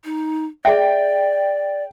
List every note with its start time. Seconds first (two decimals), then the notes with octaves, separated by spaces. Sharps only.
0.05 D#4
0.65 G#4 D5 E5 G5